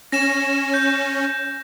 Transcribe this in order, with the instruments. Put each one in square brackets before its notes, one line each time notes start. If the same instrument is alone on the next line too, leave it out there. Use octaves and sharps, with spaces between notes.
[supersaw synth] C#4 [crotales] A#6 E7
[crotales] G6